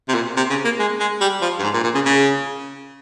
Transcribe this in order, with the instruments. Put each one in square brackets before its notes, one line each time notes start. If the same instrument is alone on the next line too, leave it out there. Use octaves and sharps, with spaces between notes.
[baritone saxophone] C3
A#2
C3
C#3
A#3
G#3
G#3
G3
F3
G2
G#2
A#2
A#2
C#3
C#3